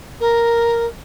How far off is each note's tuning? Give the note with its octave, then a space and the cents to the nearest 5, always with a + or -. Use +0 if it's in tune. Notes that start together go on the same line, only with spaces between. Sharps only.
A#4 +0